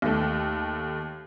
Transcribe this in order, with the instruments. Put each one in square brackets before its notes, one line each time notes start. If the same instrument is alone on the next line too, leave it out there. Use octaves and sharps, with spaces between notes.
[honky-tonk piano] D#2 A3